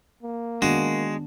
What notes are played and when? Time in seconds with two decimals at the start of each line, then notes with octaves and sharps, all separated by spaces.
0.23 A#3
0.62 D#3 G#3 B3 D4 F#4